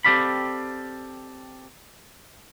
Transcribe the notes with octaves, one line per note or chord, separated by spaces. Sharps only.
C4 G4 A4 D5 F5 B5